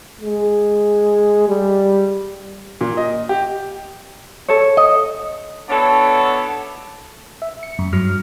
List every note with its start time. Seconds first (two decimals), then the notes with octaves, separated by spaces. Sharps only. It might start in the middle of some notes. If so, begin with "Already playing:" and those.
0.21 G#3
1.49 G3
2.81 A#2
2.97 D#5
3.29 G4
4.49 A4 C#5
4.77 D#5
5.70 B3 D4 E4 F#4 A4 C#5
7.42 E5
7.63 C#7
7.79 F#2
7.93 G2 F#3 F6